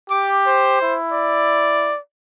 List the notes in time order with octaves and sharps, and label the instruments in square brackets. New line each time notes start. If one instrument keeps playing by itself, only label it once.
[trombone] G4 [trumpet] D6
[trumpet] C5
[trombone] E4
[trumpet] D5